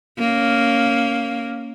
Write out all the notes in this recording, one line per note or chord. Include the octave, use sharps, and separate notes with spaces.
A#3 C#4